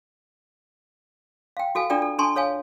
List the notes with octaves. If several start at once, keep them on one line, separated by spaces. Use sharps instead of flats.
F5 G5
F#4 A4 F5 G#5
D4 F4 A4 D5 G5
A4
D4 A4 G#5 A5 C6 C#6
A4 C#5 F5 G#5